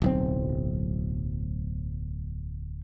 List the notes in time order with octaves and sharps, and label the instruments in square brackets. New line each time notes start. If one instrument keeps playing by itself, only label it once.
[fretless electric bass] D1 B1 C4